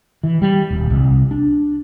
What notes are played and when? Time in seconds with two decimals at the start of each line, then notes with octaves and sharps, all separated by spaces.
0.23 E3
0.42 G3
0.70 D#1
0.90 C2
1.31 D4